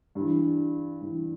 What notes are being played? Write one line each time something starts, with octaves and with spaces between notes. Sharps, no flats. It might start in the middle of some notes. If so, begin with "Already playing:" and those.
G2 E3
G2 E3